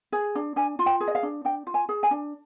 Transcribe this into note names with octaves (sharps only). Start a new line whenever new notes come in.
G#4
D4
D4 G#5
F4
G5
G#4
D#5
F5
D4
D4 G5
F4
G#5
G#4
G#5
D4